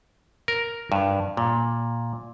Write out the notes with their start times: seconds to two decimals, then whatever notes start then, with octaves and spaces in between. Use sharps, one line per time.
0.48 A#4
0.92 G2
1.37 A#2